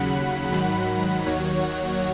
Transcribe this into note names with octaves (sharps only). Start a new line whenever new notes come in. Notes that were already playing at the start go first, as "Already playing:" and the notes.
Already playing: D#2 C#3 F#3 F#5 B5
G#2 D#3 F#3 F#5 B5
D#2 D#3 F#3 C#5 F#5
C#5 F#5